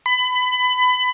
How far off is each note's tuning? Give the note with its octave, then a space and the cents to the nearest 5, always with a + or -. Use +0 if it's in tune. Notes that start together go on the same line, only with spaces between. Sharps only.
B5 +25